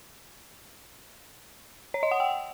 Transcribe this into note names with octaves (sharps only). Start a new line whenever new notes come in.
C#5
D#5
F#5
G5